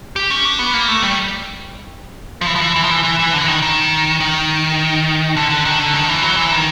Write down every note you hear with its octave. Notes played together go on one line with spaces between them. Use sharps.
G4
C#4
D4
B3
A#3
A3
G3
F3
E3
F3
E3
E3
F3
E3
E3
E3
D3
E3
D#3
D#3
D#3
D3
D3
D#3
D3
D#3
E3
F#3
E3
D#3